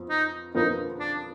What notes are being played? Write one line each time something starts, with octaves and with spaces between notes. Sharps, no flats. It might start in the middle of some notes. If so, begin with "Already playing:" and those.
Already playing: F2 F3 B3
D#4
F2 F3 B3 D#4 F4 A#4
D4